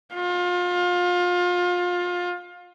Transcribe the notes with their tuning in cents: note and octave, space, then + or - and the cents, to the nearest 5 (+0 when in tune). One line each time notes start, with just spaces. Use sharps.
F4 +30